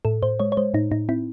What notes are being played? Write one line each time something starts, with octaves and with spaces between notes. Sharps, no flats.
A2 A4
A2 C5
G#3 C#5
C#5
G#3 C5
A2 D#4
A2 D#4
C4 E4